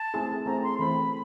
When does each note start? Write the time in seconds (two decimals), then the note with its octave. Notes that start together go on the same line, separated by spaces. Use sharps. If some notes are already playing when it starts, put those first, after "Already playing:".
Already playing: A5
0.14 A3 C4 E4 G#4
0.46 A3 C4 E4 G#4 A#5
0.63 C6
0.79 E3 A3 C4 B5